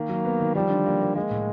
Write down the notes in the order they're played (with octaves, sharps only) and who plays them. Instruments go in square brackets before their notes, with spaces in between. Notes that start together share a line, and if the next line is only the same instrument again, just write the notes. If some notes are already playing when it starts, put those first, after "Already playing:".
Already playing: [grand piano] D#3 [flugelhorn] A#3
[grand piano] F#3
B3
D#3
[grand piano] F3 [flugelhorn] G3
[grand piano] D3
A#3
A#3
[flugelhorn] G#3 [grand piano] A#3
[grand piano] A2